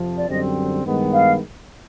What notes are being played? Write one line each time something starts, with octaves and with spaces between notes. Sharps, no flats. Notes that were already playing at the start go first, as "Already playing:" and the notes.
Already playing: F2 C3 F3
D5
F#2 D3 G3 C4 D#5
G2 D#3 G#3 B3
F5